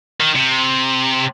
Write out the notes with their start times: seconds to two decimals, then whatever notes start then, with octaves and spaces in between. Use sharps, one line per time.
0.20 D#3
0.35 C3